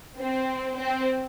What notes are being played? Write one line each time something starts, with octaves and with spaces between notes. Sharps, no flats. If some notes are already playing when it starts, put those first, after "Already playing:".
C4
C4